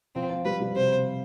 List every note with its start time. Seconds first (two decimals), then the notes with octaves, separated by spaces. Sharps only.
0.15 F3 C4
0.30 F3
0.45 G3 B4
0.60 G3
0.76 C3 C5
0.96 C3